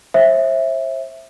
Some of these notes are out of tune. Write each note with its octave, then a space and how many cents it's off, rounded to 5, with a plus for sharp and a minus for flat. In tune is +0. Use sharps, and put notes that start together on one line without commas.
C5 +40 E5 +0